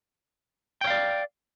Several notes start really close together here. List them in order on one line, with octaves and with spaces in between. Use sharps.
G5 C#5 F5 D5